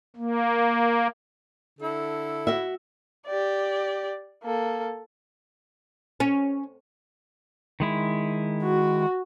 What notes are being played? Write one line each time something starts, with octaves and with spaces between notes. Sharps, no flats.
A#3
D3 E4 A4
F#4 E5
G4 D5
A#3 A4
C#4
D#3 G#3 E4
F#4